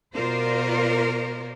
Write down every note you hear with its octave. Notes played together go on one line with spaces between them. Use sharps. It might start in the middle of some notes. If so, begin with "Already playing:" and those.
B2 F4 A#4 C5 D5